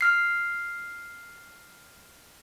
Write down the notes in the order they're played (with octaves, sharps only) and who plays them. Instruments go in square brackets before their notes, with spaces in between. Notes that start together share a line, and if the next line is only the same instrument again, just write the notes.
[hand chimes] F6 C7